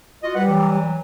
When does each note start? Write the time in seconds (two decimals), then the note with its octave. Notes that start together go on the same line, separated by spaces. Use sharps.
0.23 F4 F#4 D#5
0.35 G3 B4 F#5
0.48 E3 F#3